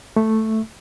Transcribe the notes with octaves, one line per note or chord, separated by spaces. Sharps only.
A3